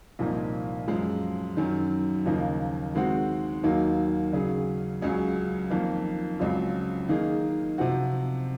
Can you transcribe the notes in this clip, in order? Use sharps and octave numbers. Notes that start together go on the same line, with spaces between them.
C2 A#2 F3 A#3 D#4
F#2 F3 G#3
F#2 D#3 F#3
D#2 C#3 F3 A#3 D#4
D#3 G#3 C4 F#4
D#2 D#3 F#3 A#3 D#4
C#3 F#3 C#4 G#4
C#2 C#3 F#3 C#4 G#4
F2 D#3 A#3
C#2 C#3 F#3 C4 F4
D#3 A#3 D#4 G#4
C3 F3 C4 F#4